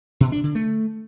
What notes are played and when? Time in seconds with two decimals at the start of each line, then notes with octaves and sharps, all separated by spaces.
0.20 B2
0.32 D4
0.44 D3
0.55 A3